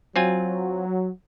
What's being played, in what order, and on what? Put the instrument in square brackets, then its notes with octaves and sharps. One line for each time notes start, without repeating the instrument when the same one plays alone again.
[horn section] F#3 [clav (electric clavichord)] C4 F4 G#5